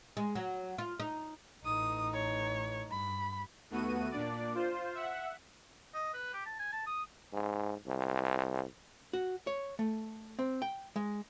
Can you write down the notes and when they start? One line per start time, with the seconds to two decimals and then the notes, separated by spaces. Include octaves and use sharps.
0.17 G#3
0.35 F#3
0.78 F4
1.00 D#4
1.65 A1 D#4 D#6
2.14 C#5
2.90 G2 B5
3.70 D#2 A3 B3 F#4 D#7
4.11 A#2 D4 D5
4.54 F4 C5
4.95 E5 F#5
5.94 D#5
6.14 B4
6.33 G4
6.46 A5
6.59 G#5
6.73 A5
6.87 D#6
7.33 G#2
7.86 C2
9.13 F#4
9.47 C#5
9.79 A3
10.39 C4
10.62 G5
10.96 G#3